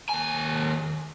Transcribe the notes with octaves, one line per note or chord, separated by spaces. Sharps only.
D#2 G#5